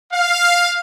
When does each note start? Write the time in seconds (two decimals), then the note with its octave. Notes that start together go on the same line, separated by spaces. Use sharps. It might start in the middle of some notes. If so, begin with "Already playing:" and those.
0.13 F5